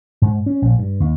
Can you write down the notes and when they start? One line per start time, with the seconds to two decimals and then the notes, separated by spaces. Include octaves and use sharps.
0.22 G#2
0.46 C#4
0.62 A#1
0.79 G2
1.00 D#2